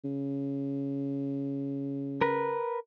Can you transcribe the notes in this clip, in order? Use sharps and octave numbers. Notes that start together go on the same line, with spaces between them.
C#3
A#4 B4